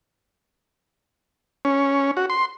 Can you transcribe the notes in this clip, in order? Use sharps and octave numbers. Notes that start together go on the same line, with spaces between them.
C#4
F#4
C6